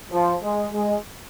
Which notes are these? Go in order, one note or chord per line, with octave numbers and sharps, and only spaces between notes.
F3
G#3
G#3